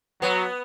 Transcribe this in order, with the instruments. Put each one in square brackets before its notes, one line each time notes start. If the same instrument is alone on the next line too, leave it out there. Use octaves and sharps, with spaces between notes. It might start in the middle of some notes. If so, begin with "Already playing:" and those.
[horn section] F#3 [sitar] B3